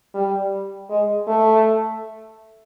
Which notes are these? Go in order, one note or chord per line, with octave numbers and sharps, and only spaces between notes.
G3
G#3
A3